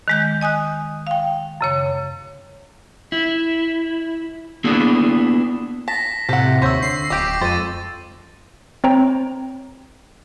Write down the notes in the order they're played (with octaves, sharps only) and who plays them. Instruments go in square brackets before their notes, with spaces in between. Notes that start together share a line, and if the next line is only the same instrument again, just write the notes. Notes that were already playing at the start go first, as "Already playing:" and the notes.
[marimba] D#3 G#3 G6
D#5 G#5 D#6 F#6
F5 G5
F#2 C#3 C#5
[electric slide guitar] E4
A#3 B3 D4 E4 F#4 G#4
[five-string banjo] A5 [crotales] A#6 B6
[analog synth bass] A2 [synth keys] C3 [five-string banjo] A4 F#5
[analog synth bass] D#2 [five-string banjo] C5 C#5 E5 [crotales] C#6 E6
[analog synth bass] D3 [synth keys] C7
[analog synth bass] D1 [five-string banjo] G4 D#5 [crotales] D6 D7
[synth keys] F2 [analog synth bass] G#3 [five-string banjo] C5 [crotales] A6 D#7
[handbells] C4 C5 C#5 G5 A#5